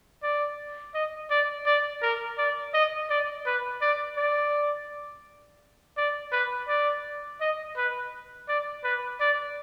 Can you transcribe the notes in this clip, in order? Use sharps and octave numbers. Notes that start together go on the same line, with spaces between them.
D5
D#5
D5
D5
A#4
D5
D#5
D5
B4
D5
D5
D5
B4
D5
D#5
B4
D5
B4
D5